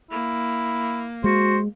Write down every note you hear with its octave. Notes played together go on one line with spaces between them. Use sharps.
A#3 E4
G#3 F#4 C5